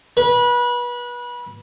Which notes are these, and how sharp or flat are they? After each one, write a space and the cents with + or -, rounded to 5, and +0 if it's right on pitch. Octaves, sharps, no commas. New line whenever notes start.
B4 -25